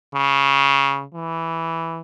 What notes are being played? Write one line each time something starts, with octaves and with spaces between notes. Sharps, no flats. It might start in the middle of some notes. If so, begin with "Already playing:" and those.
C#3
E3